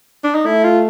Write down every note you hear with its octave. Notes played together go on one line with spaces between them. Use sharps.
D4
D#4
A3 E4
F4